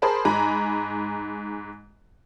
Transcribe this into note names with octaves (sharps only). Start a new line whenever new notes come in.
G#4 A#4 C5 A5 B5
G#2 G#5 A#5 B5